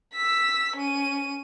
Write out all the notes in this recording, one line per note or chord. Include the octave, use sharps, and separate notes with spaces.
E6 B6
C#4 D#7